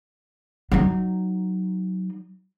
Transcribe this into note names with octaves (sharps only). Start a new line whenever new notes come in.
F#3 D#4